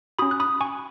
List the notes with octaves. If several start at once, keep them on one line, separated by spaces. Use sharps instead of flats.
C#4 F#4 B5 D#6
F#6
B5 D#6
G#5 C#6